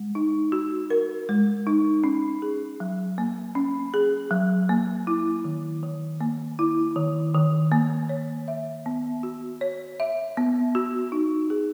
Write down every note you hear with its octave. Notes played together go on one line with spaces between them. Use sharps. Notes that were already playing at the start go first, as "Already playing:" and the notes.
Already playing: G#3
D#4
F#4
A#4
G#3
D#4
C#4
G#4
F#3
A#3
C#4
G#4
F#3
A#3
E4
D#3
D#3
A#3
E4
D#3
D#3
A#3
C#5
E5
B3
F#4
C#5
E5
B3
F#4
D#4
G#4